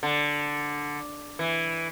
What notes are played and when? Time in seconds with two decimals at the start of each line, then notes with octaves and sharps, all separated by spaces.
0.03 D3
1.39 E3